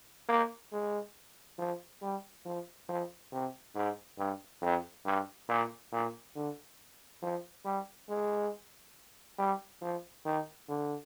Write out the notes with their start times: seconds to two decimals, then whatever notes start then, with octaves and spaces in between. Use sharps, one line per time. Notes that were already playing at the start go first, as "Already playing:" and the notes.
0.29 A#3
0.72 G#3
1.58 F3
2.02 G3
2.45 F3
2.89 F3
3.32 C3
3.75 G#2
4.18 G2
4.62 F2
5.05 G2
5.48 A#2
5.92 A#2
6.35 D3
7.22 F3
7.65 G3
8.09 G#3
9.39 G3
9.82 F3
10.25 D#3
10.68 D3